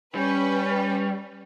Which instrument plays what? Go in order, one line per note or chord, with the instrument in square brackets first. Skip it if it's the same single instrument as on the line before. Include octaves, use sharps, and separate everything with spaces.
[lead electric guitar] G3 [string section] C#4 B4